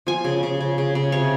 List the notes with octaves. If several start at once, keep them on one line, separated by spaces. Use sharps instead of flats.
F3 G#5
C#3
C#3
C#3
C#3
C#3
C3 C#5